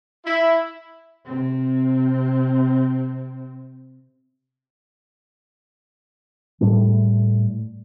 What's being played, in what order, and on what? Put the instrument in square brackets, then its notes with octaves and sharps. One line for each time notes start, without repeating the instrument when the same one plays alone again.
[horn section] E4
[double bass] C3 C4
[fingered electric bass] A2 G3 A3